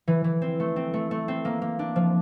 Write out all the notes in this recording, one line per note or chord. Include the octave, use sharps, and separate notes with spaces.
E3
E3
C4
A3
C4
A3
A3
C4
A#3
A#3
D4
F3